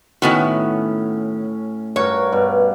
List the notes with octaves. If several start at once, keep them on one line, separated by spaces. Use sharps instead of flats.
A2 D#3 B3 C#4 F#4
G2 F#4 A#4 C#5
G2 B2